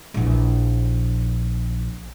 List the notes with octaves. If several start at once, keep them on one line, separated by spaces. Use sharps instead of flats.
A#1 E3